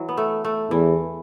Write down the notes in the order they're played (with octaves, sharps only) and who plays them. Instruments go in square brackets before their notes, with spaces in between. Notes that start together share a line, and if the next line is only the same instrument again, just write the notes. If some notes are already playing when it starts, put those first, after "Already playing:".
Already playing: [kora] E3 F#3
B3
A3
A3
[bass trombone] E2 [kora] E3